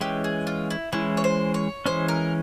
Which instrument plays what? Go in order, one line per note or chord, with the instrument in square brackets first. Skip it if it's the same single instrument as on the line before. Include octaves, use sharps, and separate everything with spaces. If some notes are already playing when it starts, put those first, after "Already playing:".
[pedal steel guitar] E3 G#3 C#4 [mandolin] G4
[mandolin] G#4
F4
E4
[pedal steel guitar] E3 G#3 C#4 [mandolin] E4
[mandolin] C#5
C5
C#5
[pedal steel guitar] E3 G#3 C#4 [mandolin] C5
[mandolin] A#4